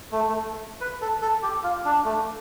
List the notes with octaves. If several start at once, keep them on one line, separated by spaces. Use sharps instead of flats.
A3
A3
B4
A4
A4
G4
F4
D4
A3